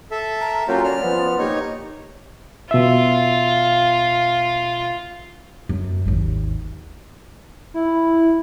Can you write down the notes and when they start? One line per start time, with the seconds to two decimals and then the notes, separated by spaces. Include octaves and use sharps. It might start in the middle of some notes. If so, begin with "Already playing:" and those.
0.11 A4 E5
0.41 A#5
0.68 F#3 A#3 C#4 F4 G4
0.84 D5 F6
1.03 F3 B3
1.39 A#3 D#4 G4 C#5
2.71 B2 F4 E5
5.69 F#2
6.05 G#1 D#2
7.74 E4